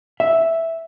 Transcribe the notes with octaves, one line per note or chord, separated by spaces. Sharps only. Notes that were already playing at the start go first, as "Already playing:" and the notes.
E5